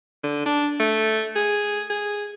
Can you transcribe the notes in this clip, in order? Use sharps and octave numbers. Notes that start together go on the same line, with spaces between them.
D3
D4
A3
G#4
G#4